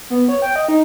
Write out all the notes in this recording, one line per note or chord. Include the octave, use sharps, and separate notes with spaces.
B3
C#5
G5
D#5
D#4